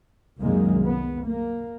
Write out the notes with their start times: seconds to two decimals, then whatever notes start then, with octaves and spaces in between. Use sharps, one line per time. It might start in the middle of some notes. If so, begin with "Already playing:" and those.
0.40 C2 F#2 D#3 G#3 A#3
0.83 B3
1.25 A#3